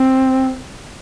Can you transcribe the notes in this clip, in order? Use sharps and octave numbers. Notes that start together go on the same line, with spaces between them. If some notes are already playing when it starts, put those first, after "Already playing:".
Already playing: C4